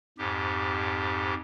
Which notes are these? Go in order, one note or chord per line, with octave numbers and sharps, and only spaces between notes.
F2 G#2 G4